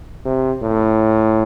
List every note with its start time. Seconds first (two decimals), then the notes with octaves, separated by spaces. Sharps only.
0.25 C3
0.62 A2